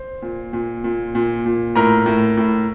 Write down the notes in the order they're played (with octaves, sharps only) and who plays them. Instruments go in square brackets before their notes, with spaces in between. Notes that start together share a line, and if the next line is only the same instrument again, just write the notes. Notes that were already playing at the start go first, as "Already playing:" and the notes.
Already playing: [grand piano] C5
A#2
A#2
A#2
A#2
A#2
A2 A#4 A#5
A2
A2